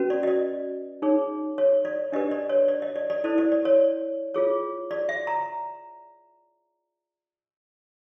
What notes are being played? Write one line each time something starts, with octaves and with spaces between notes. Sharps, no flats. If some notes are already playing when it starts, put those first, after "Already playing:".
Already playing: C#4 F#4 B4
D5
D#5
D5
D#4 G#4 C#5
C#5
D5
D4 G4 B4 D#5
D5
C#5
D5
D#5
D5
D5
E4 A4 C5 D5
D5
D5
C#5
F4 G#4 C#5
D5
E5
A#5